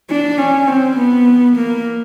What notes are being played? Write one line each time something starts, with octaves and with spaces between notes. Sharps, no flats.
D4
C#4
C4
B3
A#3